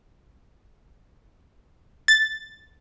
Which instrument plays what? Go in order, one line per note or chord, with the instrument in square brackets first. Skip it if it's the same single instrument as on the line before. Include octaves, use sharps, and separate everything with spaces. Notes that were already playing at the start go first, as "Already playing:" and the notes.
[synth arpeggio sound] A6